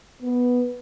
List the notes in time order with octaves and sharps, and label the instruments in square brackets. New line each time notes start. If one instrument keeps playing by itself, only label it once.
[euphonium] B3